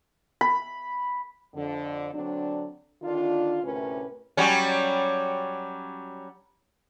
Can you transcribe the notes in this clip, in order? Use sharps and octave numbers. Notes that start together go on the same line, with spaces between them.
B5
F2 D3
D3 F#3 C4 D4
D3 D#3 D4 F4
D2 A2 C3 C#4 A#4 B4
F#3 G3 C#4